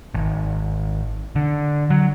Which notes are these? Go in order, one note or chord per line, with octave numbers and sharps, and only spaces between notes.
G#1
D3
F#3